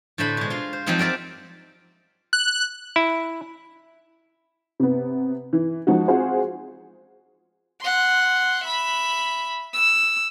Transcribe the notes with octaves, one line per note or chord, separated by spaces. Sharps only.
A2 D3 A3 C5 B5
B2 G#3
F4 C6
C5
F3 F#3 G#3 C4 D#4 F4
G4 A#4 D5 E5 A5
F#6
E4
C3 B3
E3
F3 G#3 D#4 F#4
C4 F4 F#4 G#4 C5
F#5 C6
E5 B5
E6